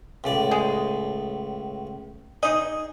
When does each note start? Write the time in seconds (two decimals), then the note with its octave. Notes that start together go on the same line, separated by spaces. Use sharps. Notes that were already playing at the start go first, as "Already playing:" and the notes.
0.24 C#2 A2 D5
0.51 G#3
2.43 D#4 G#4 D#5